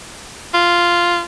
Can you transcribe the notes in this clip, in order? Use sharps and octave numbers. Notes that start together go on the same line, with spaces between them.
F4